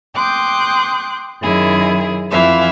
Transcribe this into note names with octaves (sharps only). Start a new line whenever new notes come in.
G5 C6 D6 D#6 F#6 G6
F#2 D#3 E4 G#4 E5
F2 E3 E5 F5